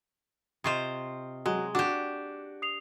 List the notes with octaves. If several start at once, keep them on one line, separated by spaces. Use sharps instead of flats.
C3 F4 C5 D#5 C#6 D#6
F#3 G#3
D4 F#4 G4 D6 E7
D#6 C7 F7